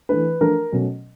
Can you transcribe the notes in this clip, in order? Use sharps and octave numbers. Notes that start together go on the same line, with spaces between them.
E3 A3 D4 B4
F3 A3 D4 A#4
B2 F#3 A3 C#4